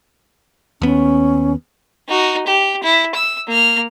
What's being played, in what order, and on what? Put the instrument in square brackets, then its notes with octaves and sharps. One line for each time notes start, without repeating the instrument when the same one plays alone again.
[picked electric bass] D#2 B3 [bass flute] C#4
[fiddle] D#4 F#4
G4
E4
E6
A#3 F6